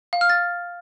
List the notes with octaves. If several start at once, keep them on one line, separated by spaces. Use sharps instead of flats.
F5
F6
A6